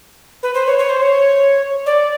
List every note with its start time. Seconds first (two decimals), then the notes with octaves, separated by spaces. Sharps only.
0.43 B4
0.55 C5
0.66 C#5
0.79 C#5
0.89 C5
1.02 C#5
1.86 D5